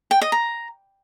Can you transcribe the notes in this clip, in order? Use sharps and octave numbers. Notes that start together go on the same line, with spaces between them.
G5
D#5
A#5